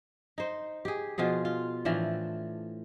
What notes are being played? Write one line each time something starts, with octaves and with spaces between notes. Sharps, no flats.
D#4 C5
G4 G#4
B2 F3 F4 G#4
F4
A2 E3 F3 D4